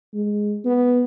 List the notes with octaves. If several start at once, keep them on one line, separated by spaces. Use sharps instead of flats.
G#3
B3